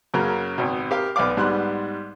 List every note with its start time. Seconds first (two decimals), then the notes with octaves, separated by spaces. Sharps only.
0.14 F#2 C#3 F#3 A#3 C#4
0.58 G#1 B2
0.91 G4 A#4 F5
1.16 B1 B3 D5 F5 D6
1.37 G#2 G3 B3 C6 F#6